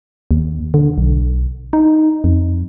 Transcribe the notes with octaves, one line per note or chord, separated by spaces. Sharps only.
D#2
D3
B1
D#4
F2